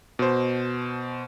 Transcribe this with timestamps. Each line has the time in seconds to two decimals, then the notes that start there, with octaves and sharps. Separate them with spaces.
0.19 B2 C5